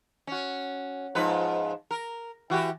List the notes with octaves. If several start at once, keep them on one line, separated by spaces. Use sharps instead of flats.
C#4 F#4
G#2 F3 B4
A#4
E3 F#4 G4